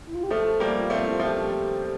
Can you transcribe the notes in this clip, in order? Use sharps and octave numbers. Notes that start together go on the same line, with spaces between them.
E4
F4
G4
F3 A3 A4
G3 A#3
F4
A3 C4
E4
F4
F3 A3 G4